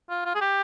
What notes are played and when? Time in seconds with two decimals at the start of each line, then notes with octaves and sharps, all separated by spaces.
0.10 F4
0.25 F4
0.35 G#4
0.41 G4